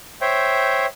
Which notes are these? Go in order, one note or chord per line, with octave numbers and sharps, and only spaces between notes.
C5 C#5 E5 G5